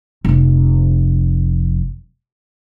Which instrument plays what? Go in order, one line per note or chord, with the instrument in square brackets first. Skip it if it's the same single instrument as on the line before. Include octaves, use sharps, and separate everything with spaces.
[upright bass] F1 F2